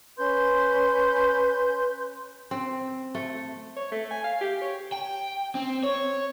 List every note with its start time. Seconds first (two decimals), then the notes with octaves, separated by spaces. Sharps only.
0.17 C#4 B4 C6 G6
2.51 C4
3.15 A3
3.76 C#5
3.92 A3
4.11 G#5
4.24 F5
4.41 G4
4.61 C#5
4.92 G5
5.55 C4
5.83 C#5